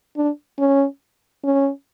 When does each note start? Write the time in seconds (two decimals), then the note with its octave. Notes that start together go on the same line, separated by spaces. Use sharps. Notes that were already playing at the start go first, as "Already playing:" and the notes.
0.17 D4
0.59 C#4
1.44 C#4